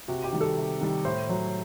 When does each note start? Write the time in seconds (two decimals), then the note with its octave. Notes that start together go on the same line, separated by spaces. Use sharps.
0.08 C3 F#4
0.24 G4
0.33 D#3 G3
0.41 A4
0.57 C3
0.81 D#3 G3
1.05 A2 C5
1.29 F#3